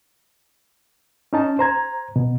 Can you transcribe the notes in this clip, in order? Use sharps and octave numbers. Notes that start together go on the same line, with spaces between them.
C#4 D#4 A5
C5 A#5 G#6
B2